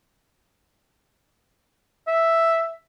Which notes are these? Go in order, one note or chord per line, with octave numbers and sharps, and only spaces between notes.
E5